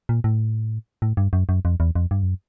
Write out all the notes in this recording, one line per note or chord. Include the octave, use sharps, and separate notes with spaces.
A#2
A2
A2
G2
F#2
F#2
F2
E2
F2
G2
F#2